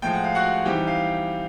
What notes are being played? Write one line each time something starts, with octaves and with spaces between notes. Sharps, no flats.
A2 F3 G#3 G5
F#5
F5
F#4 F#5
E3 G3 C4 D#4 G4 G5
F5